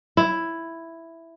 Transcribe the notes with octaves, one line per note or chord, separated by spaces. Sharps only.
E4